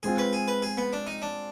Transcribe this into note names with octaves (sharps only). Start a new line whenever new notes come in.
G#3 C4 F4 G#4
B4
G#4
B4
G#4
B3
D4
D#4
D4